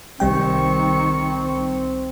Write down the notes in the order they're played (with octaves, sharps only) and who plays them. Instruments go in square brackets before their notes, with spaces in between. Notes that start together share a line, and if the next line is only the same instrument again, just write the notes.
[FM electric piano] C2 G3 G5 [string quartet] D#3 C#6 [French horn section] C4